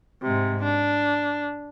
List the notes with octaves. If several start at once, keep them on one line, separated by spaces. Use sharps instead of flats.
G#2 C3
D4